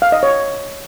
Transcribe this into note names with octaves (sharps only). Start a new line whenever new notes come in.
F5
D#5
C#5